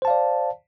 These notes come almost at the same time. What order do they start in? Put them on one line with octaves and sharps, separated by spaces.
C5 A5 F5 D5